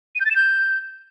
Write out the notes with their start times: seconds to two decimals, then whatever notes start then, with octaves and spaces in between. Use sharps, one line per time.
0.15 D#7
0.20 G6
0.25 A6
0.31 E7
0.36 G6